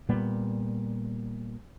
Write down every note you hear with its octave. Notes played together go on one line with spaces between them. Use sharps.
A#2 G3 B3